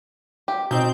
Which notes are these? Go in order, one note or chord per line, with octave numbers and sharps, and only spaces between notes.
G4
B2 C4 D#4 G6